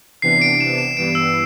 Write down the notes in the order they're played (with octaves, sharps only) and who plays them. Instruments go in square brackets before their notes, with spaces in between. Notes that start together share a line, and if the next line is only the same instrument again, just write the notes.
[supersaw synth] C3 E3 B3 D4 [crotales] C7
[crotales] D7
E7
E7
[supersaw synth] G2 E3 G3 B3 [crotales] D7
[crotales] E6